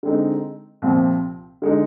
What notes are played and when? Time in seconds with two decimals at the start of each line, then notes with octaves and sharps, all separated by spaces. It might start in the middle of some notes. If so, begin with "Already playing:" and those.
0.03 D3 G#3 C4 D#4
0.82 C2 A#2 F3 C4
1.62 D3 G#3 D#4